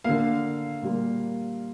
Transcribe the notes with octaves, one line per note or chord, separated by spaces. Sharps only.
D3 A#3 F5
A#2 G3 A#3